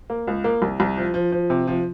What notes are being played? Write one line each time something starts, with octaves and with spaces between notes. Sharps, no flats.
A#3
C#2
A#3
C2
C2
F3
F3
F3
C3
F3